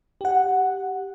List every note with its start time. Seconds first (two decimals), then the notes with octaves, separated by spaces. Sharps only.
0.21 G4 F#5